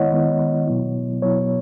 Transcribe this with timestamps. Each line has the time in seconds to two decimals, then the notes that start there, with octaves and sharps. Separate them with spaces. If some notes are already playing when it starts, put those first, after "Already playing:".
Already playing: D#3 G#3 B3 E4 C#5 D#5 F#5
0.12 D#3 G#3 B3 E4
0.67 B2 F#3 B3 E4
1.22 B2 F#3 B3 E4 C#5